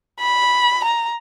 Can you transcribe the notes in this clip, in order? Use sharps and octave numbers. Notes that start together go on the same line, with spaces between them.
B5
A#5